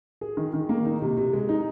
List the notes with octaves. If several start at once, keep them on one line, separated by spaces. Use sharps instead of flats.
G#4
D#3
D#3
A#3
D#4
C3
C3
G#3
D#4